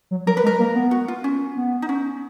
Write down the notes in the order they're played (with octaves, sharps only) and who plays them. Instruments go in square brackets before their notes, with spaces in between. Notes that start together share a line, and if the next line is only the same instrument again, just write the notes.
[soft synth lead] F#3
[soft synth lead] F#3 [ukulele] A#4
[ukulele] B4
[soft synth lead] G#3
[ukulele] A#4
[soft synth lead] A#3
B3
[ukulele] F#4
F4
C#4
[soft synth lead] B3
[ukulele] D#4
C#4